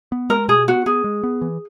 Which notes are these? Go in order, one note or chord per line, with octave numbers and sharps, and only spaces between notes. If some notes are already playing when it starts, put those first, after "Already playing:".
B3
G#3 A#4
B2 G#4
B3 F#4
B3 G#4
G#3
B3
E3